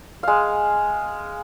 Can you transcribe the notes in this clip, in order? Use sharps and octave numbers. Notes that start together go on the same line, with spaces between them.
G#3 F5